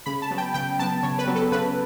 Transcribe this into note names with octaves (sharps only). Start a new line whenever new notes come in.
C#3 B5
A5
F#3 B3
G5
C#3 G5
F#3 B3 A5
C#3 C#5
B4
F#3 B3
A4
C#3 B4